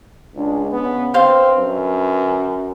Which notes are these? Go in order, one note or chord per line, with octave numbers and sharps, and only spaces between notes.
C#2 G#3 D4
C#3 B3
D3 C4 B4 C5 F5 C6
F#2